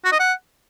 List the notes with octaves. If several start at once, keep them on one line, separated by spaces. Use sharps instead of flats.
F#4
D#5
F#5